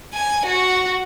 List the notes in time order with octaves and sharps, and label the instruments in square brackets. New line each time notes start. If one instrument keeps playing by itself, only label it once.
[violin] G#5
F#4